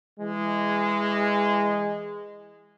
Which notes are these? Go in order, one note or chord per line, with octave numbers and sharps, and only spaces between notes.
E3 G#3